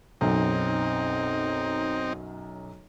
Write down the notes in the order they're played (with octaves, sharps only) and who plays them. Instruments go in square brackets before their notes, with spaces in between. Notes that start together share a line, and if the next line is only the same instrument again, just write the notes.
[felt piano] B1 F#2 [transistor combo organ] C4 D#4